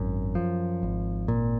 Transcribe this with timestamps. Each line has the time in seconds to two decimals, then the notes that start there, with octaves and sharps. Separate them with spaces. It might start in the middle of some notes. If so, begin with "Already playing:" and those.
Already playing: G#1 F#2
0.35 F3
0.83 G#1
1.28 A#2